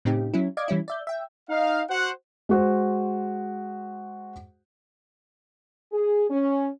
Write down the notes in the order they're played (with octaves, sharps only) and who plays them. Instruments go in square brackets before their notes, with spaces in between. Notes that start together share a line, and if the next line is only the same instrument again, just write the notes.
[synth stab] A2 C#3 C4 D#4 G4
F#3 C#4 E4
D5 D#5 F5 D6 G#6
E3 G3 C#4 E4
D5 E5 G6
E5 G5
[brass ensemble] D#4 F5
F#4 C5 F#5
[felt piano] G#3 F#4 C5
[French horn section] G#4
C#4